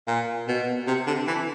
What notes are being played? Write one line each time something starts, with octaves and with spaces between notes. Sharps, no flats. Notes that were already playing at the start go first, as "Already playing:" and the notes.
A#2
B2
C3
D3
E3